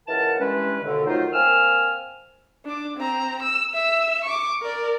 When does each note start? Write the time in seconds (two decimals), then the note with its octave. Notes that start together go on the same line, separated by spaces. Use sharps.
0.08 C#2 E3 A#4 F#5 A5
0.40 G2 E3 G#3 C#4 B4
0.84 D#2 B2 D3
1.07 D#3 F#3 A3 D#4 F4 C5
1.33 A#3 C4 G#5 E6 F6
2.65 D4 D6
2.97 C4 A#5
3.42 E6
3.74 E5 E6
4.24 C#6 D6
4.62 A#4 D5